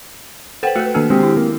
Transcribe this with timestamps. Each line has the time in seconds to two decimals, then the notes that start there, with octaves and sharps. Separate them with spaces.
0.63 A4 B4 C5 F#5 G5
0.76 A3 F#4 A4 B4
0.94 D#3 A#3 D4 A4 F6
1.10 G#3 C4 G4
1.23 E4
1.36 A#3